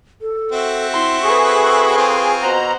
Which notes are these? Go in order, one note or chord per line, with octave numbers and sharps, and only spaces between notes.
A4
C4 F#4 E5
E4 C6
G#4 A4 B4 C#6
C4 F4 G#5
B2 C5 F#5 A#5